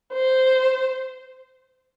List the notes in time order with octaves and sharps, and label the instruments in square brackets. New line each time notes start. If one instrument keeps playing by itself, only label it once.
[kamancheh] C5